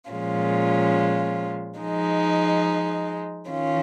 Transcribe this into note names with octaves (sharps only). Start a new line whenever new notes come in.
A#2 F3 G#3 C#4 F4
F3 G#3 D#4
D#3 C#4 F4